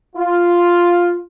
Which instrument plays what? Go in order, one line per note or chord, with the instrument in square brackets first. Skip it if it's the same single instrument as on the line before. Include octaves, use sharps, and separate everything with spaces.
[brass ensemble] F4